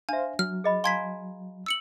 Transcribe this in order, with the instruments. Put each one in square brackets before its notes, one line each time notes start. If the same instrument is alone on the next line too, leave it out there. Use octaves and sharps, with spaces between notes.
[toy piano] D4 E5 [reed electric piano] C5 F5 [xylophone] G#5
[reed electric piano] F#3 [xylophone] F6
[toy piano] G#4 D#5 B5
[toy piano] F5 G#5 A#5 [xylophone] C6 G#6 B6
[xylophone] E6 C#7 F#7